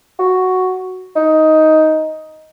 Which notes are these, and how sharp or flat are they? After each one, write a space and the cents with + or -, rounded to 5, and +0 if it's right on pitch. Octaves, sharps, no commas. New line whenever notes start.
F#4 +0
D#4 +10